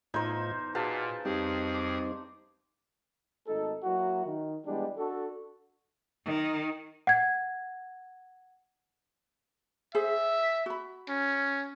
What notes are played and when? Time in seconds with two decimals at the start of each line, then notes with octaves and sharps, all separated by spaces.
0.14 E2 A2 D#4 F4 C5 G#6
0.75 A#2 F#4 G#4 B4 F5 A5
1.25 F2 G3 C4 D#4 G4 G#4
1.74 D6
3.47 G#1 A3 D#4 A4
3.84 F#3 A#3 E4 F#4
4.26 D#3
4.66 E3 G3 G#3 B3 D4
4.98 D4 F#4 A4
6.25 D#3
7.07 F#5 G#6
9.95 G#4 C5 E5
10.66 F#4 B5
11.09 C#4